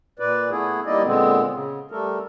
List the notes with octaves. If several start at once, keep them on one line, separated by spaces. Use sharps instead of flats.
A#2 B4 D5
A3 B3 E4 G#4
G3 A#3 D#4 E4 D5 D#5
A#2 D3 G#3 B3 C4
C#3
G3 A3 A4 A#4